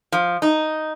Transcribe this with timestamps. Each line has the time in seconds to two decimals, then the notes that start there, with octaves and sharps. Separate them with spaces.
0.12 F3
0.42 D#4